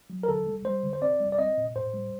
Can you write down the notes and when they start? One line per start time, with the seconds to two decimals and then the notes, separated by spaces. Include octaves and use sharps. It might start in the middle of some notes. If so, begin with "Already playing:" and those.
0.10 F#3
0.23 A#4
0.28 D3 A4
0.47 G3
0.65 G3 C5
0.83 D3
0.93 C5
1.02 C4 D5
1.20 G3
1.32 D5
1.38 C4 D#5
1.58 A#2
1.76 A2 C5
1.94 G3